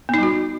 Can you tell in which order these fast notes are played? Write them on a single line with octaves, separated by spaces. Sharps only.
B3 D#4 G3 F#4